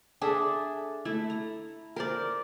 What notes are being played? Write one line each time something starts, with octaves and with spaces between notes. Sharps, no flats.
D4 G#4 A4 E5
A3 E4
A#5
A#4 C5 D5